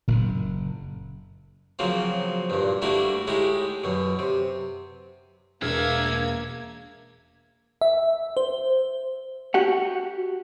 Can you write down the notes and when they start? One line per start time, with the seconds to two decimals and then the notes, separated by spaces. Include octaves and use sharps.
0.08 F#1 A#2
1.79 C#3 F3 F#3 A#3 C4
2.50 G2 A#2
2.82 G3 A3 A#3 D4 E4 F#4
3.27 A2 G#3 D#4 E4 G4
3.84 F#2 B2
4.19 C3
5.62 E1 A#3 D4 E5 F6 G#6
7.81 E5
8.37 C5
9.54 F#4 G4 F#5